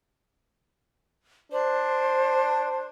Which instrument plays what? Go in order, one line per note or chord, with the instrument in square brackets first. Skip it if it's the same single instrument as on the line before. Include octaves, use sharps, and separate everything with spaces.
[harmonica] D4 [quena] C5